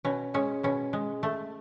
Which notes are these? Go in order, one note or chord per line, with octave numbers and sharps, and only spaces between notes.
B2 C#4
G#3 C#4
B2 C#4
G#3
A3